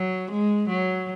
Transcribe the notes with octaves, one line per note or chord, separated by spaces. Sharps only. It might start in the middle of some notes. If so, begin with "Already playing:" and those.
Already playing: F#3
G#3
F#3